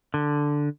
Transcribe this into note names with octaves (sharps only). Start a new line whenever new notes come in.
D3